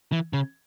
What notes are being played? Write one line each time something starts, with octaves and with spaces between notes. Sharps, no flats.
E3
C#3